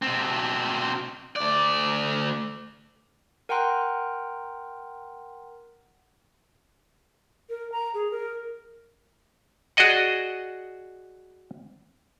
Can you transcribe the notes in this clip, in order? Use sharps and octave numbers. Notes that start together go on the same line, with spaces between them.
B2 C4
D2 D5
A#4 F#5 G5 A#5 C6 F#6
A#4
A#5
G#4
A#4
F#4 G#4 D5 D#5 F#5